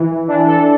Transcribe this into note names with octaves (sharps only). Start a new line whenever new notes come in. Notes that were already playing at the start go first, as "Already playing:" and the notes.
Already playing: E3
E3 D4
A4